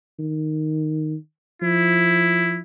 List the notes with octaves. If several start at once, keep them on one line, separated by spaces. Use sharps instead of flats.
D#3
F3 E4